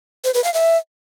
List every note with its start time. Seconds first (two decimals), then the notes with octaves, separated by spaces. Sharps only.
0.25 C5
0.34 B4
0.44 F5
0.54 E5